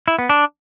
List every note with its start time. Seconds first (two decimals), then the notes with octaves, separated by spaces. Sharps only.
0.08 E4
0.19 B3
0.29 D4